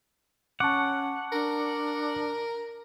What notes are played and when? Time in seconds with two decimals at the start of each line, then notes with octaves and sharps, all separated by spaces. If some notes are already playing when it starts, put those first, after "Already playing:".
0.60 C#4 F#5 A5 C#6 D6
1.32 D4 A#4